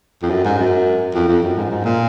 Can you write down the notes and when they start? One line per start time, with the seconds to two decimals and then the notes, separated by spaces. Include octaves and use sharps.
0.23 F2
0.30 F#2
0.45 G#2
0.59 F#2
1.14 F2
1.29 F2
1.43 F#2
1.57 G#2
1.71 G#2
1.85 A#2